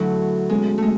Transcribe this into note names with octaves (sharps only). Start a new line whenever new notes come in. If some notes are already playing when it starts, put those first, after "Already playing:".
Already playing: D3 F#3 A3 E4
B2 G#3 A3 C#4 F#4 A4
G#3 A3